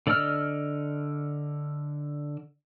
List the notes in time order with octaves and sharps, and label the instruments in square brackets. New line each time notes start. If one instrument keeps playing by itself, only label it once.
[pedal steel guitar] D3 D5 D#5 E6 F6